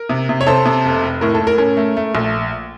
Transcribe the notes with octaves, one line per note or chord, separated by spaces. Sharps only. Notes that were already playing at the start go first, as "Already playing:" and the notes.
Already playing: A#4
C3
C3
C#5
C3 A4 C5
C3
F1
F1
A2 A#4
A4
A2
A#4
C#4 A#4
A3
A3
A#1